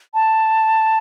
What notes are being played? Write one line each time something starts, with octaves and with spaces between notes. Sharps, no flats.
A5